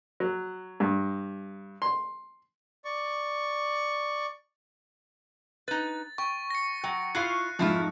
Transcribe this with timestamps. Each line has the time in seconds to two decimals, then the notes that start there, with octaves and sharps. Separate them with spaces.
0.20 F#3
0.80 G2
1.82 C6
2.85 D5 C#6
5.68 D#4 B4 A6
6.18 G5 C#6
6.50 A#6 C#7
6.84 F#3 G5
7.15 E4 F4 F5 C#6 F#6 C7
7.59 F2 G#2 F3 E4 F4